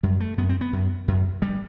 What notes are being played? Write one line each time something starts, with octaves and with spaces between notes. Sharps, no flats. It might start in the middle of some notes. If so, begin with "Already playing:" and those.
F#2 G3
A3
F#2 B3
C4
B3
F#2
F#2
G2 G3